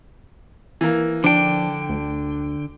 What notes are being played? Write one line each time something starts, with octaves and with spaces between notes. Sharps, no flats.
E3 A#3
D3 F3 D4 G5
D2